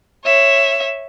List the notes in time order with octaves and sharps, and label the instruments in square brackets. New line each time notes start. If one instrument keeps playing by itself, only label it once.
[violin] C#5 E5